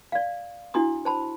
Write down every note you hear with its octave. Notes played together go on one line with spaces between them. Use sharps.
D5 F5
D4 E4 F#4 C6 D#6
C5 A5 B5